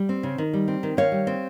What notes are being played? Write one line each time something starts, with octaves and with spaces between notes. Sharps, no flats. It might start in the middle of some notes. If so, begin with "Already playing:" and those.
Already playing: G3
C4
C#3
D#3
G3
C4
D#3
D#3 C#5 F5
G3
C4